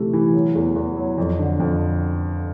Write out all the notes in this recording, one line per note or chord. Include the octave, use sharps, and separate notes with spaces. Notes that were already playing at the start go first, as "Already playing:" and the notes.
Already playing: C3 E3 A3
E3
F#3
E2
E2
F#3
F2
D3
F2